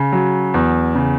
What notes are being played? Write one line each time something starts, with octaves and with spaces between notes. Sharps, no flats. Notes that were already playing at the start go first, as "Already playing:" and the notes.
Already playing: C#3
F#3
E2
C#3